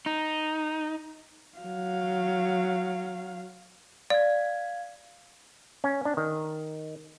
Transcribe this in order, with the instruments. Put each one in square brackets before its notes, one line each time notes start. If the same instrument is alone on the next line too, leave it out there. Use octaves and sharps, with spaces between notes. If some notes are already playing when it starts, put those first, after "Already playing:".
[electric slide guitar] D#4
[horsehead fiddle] F#3 F5
[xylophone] D5 [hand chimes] F5 G#6
[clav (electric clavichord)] C#4
D4
D#3